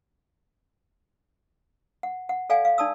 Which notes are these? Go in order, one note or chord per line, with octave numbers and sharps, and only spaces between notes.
F#5
F#5
A4 D5 F5 F#5 G#5
F5
D#4 D5 A5 D#6 E6